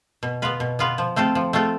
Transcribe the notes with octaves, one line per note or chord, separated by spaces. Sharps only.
B2
B3 F4 B4
B2
B3 F4 B4
F3
A3 C4 F4 A4
F3
A3 C4 F4 A4